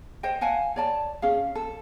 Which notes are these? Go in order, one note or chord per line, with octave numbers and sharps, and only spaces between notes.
C5 D#5 G5
F5 F#5 G#5 A5
C#5 D5 A5
C#4 G#4 F5
A4